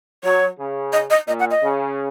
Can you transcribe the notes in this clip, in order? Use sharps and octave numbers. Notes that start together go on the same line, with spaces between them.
F#3 C#5
C#3
D#5
D#5
A#2 D#5
F#5
D#5
C#3